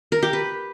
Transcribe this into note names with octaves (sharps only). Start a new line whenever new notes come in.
A#4
G4
B4